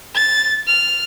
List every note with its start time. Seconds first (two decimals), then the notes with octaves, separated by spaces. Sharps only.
0.15 A6
0.67 F6